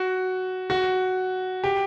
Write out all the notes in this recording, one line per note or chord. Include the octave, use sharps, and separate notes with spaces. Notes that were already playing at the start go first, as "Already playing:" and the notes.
Already playing: F#4
F#4
G4